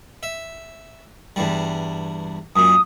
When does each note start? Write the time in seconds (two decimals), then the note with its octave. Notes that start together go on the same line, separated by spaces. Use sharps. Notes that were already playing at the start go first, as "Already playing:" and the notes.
0.23 E5
1.36 E2 G2 G3
2.56 F#2 A#2 D#6